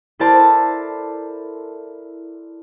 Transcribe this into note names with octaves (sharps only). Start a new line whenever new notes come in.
E4 A4 A#4 C5 D5 A5